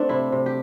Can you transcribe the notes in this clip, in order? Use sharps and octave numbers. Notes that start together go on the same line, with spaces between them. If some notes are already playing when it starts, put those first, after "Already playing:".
Already playing: A3 C4 D4
C3 E4
C3
G4